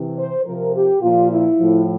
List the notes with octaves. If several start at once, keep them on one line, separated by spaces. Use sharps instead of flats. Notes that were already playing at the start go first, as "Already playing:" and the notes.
Already playing: C3 E3
C5
C3 F3 A#4
G4
A#2 F3 F4
E4
A2 F3